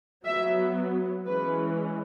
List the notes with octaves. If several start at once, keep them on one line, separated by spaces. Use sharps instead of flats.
F#3 B3 E5
E3 G#3 C#4 B4